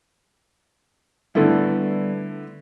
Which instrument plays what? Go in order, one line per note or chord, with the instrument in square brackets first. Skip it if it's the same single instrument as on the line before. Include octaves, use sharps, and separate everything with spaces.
[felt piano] D3 A3 E4 [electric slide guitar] G3 B3 A4